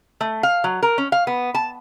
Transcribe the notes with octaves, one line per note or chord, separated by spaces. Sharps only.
A3
F5
F#3
A#4
C#4
F5
B3
A5